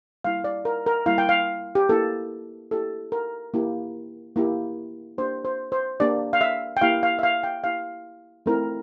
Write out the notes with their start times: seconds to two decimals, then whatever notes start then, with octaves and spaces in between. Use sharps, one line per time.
0.24 G3 A#3 E4 F5
0.44 D5
0.65 A#4
0.86 A#4
1.06 G3 A#3 E4 F5
1.18 G5
1.29 F5
1.75 G4
1.89 A#3 E4 G4 A4
2.71 A#3 E4 G4 A4
3.12 A#4
3.54 A#3 E4 G4
4.36 A#3 E4 G4
5.18 A#3 D4 G4 C5
5.45 C5
5.72 C5
6.00 A#3 D4 G4 D5
6.33 F5
6.41 E5
6.77 G5
6.81 A#3 E4 G4 F5
7.03 F5
7.19 E5
7.23 F5
7.43 G5
7.64 A#3 E4 G4 F5
8.46 A3 C4 E4 A#4